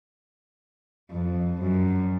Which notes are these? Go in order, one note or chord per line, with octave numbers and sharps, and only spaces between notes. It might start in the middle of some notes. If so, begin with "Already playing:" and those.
F2
F#2